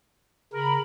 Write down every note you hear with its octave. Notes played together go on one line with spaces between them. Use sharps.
C#3 A#4 B5